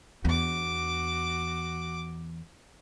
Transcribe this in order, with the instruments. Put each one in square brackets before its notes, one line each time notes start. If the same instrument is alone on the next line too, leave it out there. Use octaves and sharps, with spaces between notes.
[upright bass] E2 D4 [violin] F#4 D6